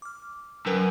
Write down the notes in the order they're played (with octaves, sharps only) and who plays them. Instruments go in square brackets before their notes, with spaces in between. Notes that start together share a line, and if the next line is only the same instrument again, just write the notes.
[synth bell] D6 F6
[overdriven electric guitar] F#2 [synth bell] A#4 B4 G5